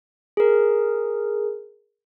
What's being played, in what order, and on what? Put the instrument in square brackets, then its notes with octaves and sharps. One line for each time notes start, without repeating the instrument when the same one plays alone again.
[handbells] G#4 A#4